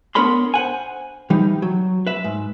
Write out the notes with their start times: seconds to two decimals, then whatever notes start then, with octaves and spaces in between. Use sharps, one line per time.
0.15 B3 D4 A#4 C#5 B5 C6
0.54 C5 F#5 G#5
1.30 E3 G3 D#4
1.62 F#3
2.07 B4 E5
2.24 G#2